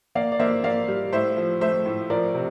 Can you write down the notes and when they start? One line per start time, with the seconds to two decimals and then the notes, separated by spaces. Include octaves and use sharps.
0.15 A#3 D5 F5
0.32 D5
0.39 A#3 C5 E5
0.64 A#3 D5 F5
0.88 G3
1.13 A2 C5 E5
1.37 F3
1.61 A3 C5 E5
1.86 A2
2.10 F3 A#4 D5
2.34 C3